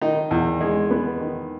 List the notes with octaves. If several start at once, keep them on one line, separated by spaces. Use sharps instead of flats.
D#3 D#4
E2
G#3
B3
D#3